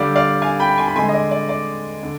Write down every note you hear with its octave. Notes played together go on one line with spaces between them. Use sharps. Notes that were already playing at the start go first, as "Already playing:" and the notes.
Already playing: D3 G3 D5 F5
D5 F5
F5 G#5
G5 B5
G#5 C6
B5
D3 G#3 G#5 C6
D#5
D5
D5
D5
D3